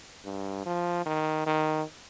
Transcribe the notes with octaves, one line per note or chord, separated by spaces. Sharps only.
G2
F3
D#3
D#3